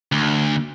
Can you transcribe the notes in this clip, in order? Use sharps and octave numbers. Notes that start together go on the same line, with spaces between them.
D2